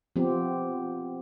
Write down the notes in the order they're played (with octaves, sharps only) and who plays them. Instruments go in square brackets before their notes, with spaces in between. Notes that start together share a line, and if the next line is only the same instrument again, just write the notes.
[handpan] F3 B3 C4 G4